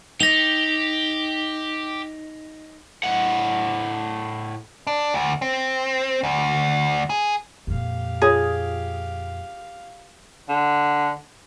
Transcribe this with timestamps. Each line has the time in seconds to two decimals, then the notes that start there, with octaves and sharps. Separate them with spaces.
0.20 D#4 G4 A#6 F7
3.04 A2 F#5
4.87 D4
5.14 D2
5.42 C4
6.23 D2
7.10 G#4
7.67 F2 A#2 G4 F5
8.22 F4 G#4 C#5 D#6
10.49 D3